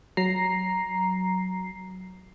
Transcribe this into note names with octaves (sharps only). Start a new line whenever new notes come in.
F#3 A#5 C7